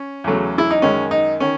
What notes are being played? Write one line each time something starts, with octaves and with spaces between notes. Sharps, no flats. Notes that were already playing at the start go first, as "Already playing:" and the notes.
Already playing: C#4
E2 C#3 F#3 A3
E4
D#4
F#2 D#3 G#3 C#4
D#4
D#3 C#4